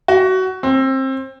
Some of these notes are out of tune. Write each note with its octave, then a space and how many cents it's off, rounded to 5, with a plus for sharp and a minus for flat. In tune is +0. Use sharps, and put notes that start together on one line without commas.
F#4 +20
C4 +25